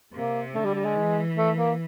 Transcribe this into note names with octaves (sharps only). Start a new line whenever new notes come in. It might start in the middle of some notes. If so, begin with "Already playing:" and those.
C3 A#3
D3 A3
G3
G3
G#3
E3
A3
A#3